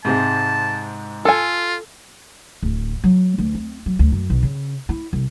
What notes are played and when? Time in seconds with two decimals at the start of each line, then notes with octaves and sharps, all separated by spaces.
0.05 G#2 C3 G#3 A5
1.25 F4 A4 G#5
2.63 D1
3.04 F#3
3.38 D2
3.55 C4
3.86 F#3
3.99 D2
4.12 F#2
4.30 B1
4.43 C#3
4.89 E4
5.13 C2